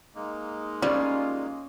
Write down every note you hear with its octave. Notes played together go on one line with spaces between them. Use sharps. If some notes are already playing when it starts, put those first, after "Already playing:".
G#3 A#3 D#4
G3 C#4 F4